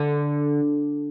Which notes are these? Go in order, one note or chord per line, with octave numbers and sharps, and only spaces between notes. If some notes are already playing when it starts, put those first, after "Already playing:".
Already playing: D3